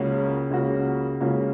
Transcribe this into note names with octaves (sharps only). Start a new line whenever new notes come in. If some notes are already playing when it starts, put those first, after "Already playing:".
Already playing: C#2 C#3 A#3 C#4 F#4
C#2 C#3 A#3 C#4 F#4
C#2 C#3 A#3 C#4 F#4